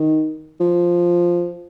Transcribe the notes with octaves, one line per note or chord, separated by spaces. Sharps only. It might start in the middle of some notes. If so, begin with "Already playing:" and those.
Already playing: D#3
F3